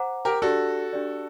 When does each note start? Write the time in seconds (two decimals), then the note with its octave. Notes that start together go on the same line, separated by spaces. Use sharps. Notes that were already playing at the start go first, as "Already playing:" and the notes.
Already playing: C5 F#5 A#5 D6
0.25 G4 A#4
0.42 D4 F#4 G4 A4 D5
0.93 D4 G4 D5